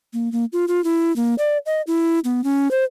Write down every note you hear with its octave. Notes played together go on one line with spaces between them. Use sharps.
A#3
A#3
F4
F4
E4
A#3
D5
D#5
E4
B3
C#4
C5